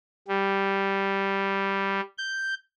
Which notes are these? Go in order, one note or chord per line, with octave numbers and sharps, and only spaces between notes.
G3
G6